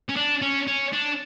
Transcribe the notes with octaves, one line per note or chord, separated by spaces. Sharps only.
C#4
D4
C#4
C#4
D4